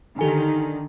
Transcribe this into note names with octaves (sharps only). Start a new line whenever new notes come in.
D3 D#3 G4 A4 G#5